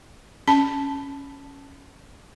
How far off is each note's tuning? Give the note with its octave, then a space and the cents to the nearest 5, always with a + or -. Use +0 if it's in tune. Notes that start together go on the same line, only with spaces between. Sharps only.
C#4 +0 A5 +0